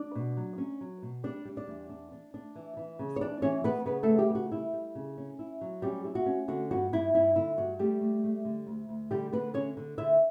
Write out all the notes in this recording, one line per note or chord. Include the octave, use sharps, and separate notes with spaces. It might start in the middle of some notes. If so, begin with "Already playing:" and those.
Already playing: D4 D5
B2
F#3
C#4
F#3
B2
G3 D4 D5
G3
D4 D5
E2
D4
D4
D4
E3
E3
C#3
C#5
E3 D4 D5
E3 C#4 C#5
E3 B3 B4
C#3 B3 B4
A3 A4
B3
G3 G4
C#3
F#4
G3 E4
G3
C#3
C#4
E4
F#3
G3 C#4 G4
E4
F#4
C#4
D3 F#4
G2 F#4
G2 E4
G2 E4
D3 E4
G2 F#4
G3 A3 G4
A3
A3
D3
D2
D2
D3 G3 G4
D3 B3 B4
D3 C#4 C#5
D3
D3 E4 E5